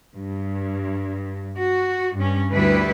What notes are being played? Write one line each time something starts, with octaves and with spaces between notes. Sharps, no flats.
G2
F#4
G2 C#4
D2 G3 E4 B4